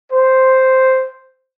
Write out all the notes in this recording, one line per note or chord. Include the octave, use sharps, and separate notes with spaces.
C5